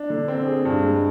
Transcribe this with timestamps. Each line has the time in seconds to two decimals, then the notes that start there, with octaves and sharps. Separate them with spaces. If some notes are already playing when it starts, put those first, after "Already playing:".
Already playing: D4
0.10 D3
0.28 C4
0.46 G#4
0.65 G2
0.83 G#3